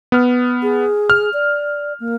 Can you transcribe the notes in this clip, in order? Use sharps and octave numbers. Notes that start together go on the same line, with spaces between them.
B3 F6
G#4
F6
D5
A#3